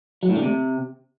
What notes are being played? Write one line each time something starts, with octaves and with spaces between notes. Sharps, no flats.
F#3
A2
D3
C3